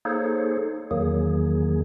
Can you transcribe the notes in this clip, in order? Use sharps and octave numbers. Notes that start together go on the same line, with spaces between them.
A#3 D#4 G#4 A4 C5 C#5
E2 D#3 F#3 A#3 G#4